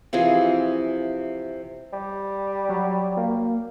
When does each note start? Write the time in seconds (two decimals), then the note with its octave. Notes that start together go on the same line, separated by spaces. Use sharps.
0.13 C3 E3 F3 G#4
1.93 G3
2.69 F#3
3.17 A#3